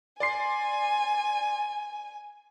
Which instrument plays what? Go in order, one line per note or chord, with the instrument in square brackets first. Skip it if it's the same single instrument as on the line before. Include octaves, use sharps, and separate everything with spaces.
[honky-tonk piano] D5 C6 C7 [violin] G#5